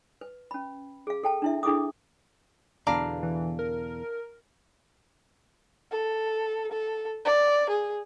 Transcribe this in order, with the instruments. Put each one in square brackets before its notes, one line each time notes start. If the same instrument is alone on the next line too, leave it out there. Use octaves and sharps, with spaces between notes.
[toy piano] B4
C#4 B5
G#4 F5
A4 G5 A5
D4 E4 E5
D4 E4 G#4 A4 D6 D#6
[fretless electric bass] E2 B2 D3 [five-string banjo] D4 F5 A#5
[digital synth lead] E3
A#4
[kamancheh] A4
A4
D5
G#4